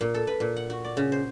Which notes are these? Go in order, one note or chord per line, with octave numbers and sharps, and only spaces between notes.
A#2
A4
B4
A#2
F#5
F#4
D5
C#3
C5